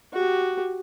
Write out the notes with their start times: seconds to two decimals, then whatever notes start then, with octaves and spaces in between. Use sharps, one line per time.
0.13 F#4 G4